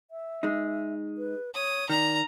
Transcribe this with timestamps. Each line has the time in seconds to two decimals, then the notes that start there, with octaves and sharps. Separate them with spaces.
0.11 E5
0.43 G#3 D#4
1.18 B4
1.55 C#5 D#6
1.90 D#3 D5 A#5